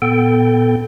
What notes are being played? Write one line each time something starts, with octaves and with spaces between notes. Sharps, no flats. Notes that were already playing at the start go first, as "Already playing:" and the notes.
A#2 B3 A4 G5